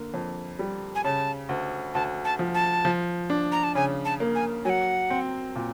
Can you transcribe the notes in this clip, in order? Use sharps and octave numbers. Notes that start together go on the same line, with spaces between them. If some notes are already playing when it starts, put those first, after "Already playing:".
Already playing: D3 A#3
F2
G3
G#5
C#3 A5
D2
D2 A5
A5
F3
A5
F3
D4
A#5
A5
C#3 G#5
A5
A#3
G#5
F#3 F#5 G#5
C4
A#2